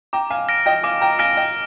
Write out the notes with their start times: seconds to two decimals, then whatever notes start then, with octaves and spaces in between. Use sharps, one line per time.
0.13 G5 A#5 D6
0.30 F5 G#5
0.48 F6 A#6 D7
0.66 D#5 G5
0.83 F5 G#5 D6
1.01 G5 A#5
1.19 F5 G#5 F6 A#6 D7
1.37 D#5 G5